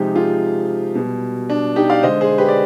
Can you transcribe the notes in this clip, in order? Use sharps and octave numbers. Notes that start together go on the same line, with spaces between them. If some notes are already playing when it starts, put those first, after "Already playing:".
Already playing: C3 F3 G#3 D#4 G4
F4 G#4
B2 G3
D4
D#4 G4
D5 F5
D3 G#3 C5 D#5
G#4 C5
G4 B4
D5